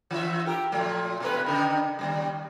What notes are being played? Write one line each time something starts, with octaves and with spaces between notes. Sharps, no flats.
E3 F4 E5
G4 A#4
A#2 F3 A3
B2 A#4 B4
C#3 D#4 A#4
D#2 B2 G3